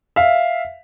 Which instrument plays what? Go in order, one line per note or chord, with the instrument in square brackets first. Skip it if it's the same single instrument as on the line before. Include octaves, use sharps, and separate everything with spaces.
[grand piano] E5 F5